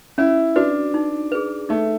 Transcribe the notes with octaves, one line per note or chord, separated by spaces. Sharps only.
C#4 E4
D4 F#4 B4
D#4
G#4 B4
A3 D#4